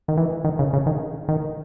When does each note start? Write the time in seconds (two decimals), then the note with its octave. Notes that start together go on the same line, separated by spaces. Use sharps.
0.08 D#3
0.17 E3
0.44 D#3
0.59 C#3
0.73 C#3
0.86 D#3
1.29 D#3